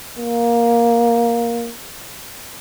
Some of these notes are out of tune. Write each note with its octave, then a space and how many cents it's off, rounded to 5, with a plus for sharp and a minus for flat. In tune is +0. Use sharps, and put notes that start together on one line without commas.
A#3 +10